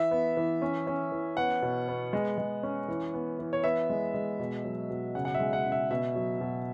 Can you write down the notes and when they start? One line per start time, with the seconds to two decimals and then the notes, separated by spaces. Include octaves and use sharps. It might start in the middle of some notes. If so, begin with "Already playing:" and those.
Already playing: E3 E5
0.11 B3
0.37 E3
0.62 C#4
0.87 C#4
1.12 E3
1.37 B3 F#5
1.62 B2
1.88 B3
2.13 G#3
2.38 G#3
2.63 C#4
2.88 E3
3.14 B3
3.39 E3
3.53 C#5
3.64 B3 E5
3.90 G#3
4.14 G#3
4.39 B2
4.64 F#3
4.90 B2
5.15 C#3 F#5
5.25 F#5
5.34 E5
5.40 G#3
5.53 F#5
5.65 C#3
5.72 E5
5.91 B2 E5
6.15 F#3
6.41 B2